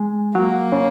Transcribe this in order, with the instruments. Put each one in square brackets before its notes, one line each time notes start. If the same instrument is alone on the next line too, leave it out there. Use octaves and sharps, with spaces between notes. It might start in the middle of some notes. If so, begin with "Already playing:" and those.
Already playing: [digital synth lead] G#3
[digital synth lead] F#3 [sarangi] A#3
[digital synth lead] C#3